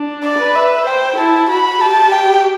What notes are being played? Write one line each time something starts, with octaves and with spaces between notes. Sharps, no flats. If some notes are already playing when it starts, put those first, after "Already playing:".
Already playing: D4
D5
B4
E5
C5 G5
E4 A5
F#4 B5
G4 A5
G5